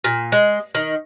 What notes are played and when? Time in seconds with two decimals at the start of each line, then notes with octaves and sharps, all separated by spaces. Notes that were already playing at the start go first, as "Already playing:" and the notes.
0.04 A#2
0.32 G#3
0.75 D#3